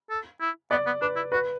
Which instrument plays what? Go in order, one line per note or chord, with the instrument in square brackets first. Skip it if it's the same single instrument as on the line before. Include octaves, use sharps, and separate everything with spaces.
[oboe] A4
E4
[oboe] B3 [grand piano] D5
[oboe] B3
[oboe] D4 [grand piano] B4
[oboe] E4
[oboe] F#4 [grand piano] B4